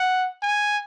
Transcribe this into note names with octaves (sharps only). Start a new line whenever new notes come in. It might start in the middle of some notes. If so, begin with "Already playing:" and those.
Already playing: F#5
G#5